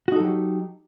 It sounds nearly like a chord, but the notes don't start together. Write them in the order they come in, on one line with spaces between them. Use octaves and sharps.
F#4 D#4 A4 F#3 G4